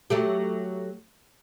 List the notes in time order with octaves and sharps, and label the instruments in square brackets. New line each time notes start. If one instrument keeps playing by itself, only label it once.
[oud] F#3 A3 G4